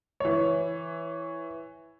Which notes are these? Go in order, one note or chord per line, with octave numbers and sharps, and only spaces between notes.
E3 C#5